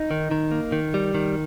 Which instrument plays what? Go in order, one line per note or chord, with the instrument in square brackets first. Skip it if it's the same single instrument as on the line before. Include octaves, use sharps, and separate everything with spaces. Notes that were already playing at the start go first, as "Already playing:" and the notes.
Already playing: [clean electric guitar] D#4
D#3
D#3
A#3
D#3
G3
D#3